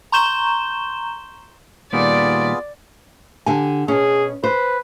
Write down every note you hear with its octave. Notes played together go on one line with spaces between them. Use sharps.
A#5 C6 C#6 G6 E7 G7
A#2 D#3 G3 B3 F4 G#4 D5
D3 G4 G#5
B2 C#4 G#4
B4 C5